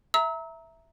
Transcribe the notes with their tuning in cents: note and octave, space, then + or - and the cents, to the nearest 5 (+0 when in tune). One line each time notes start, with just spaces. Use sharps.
E5 +0 A#5 +0 E6 -40